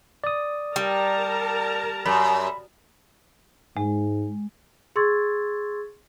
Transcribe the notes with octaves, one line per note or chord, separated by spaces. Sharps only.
D5 D#6
G3 A#4 A5 A#5
F#2 B5
G#2 G#3
G#4 C6 C#6 E6 G#6 A6